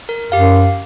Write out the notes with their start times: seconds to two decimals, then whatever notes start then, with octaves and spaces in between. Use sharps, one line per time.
0.09 A#4
0.32 F#2 G4 F5